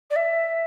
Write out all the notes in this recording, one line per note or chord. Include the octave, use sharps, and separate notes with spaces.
D5
E5